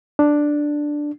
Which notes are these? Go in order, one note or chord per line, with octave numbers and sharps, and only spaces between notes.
D4